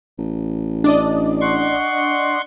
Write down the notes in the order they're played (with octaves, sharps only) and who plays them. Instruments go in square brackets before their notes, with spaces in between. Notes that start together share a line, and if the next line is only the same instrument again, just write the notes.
[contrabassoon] A1
[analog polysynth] D4 D5 D#5
[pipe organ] F#5 C6 C#6